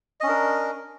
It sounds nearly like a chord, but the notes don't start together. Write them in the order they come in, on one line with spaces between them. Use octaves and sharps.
D#5 C#4 D4 A#4